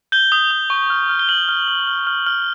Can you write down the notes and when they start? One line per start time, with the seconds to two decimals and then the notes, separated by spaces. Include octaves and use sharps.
0.12 G6 G7
0.32 D#6
0.51 D#6
0.70 C#6
0.90 F6
1.09 F6
1.19 G7
1.29 F6 F#7
1.49 F6
1.68 F6
1.87 F6
2.07 F6
2.26 F6